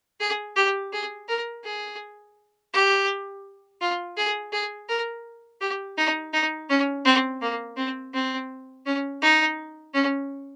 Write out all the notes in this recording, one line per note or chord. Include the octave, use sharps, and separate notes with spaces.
G#4
G4
G#4
A#4
G#4
G4
F4
G#4
G#4
A#4
G4
D#4
D#4
C#4
C4
A#3
C4
C4
C#4
D#4
C#4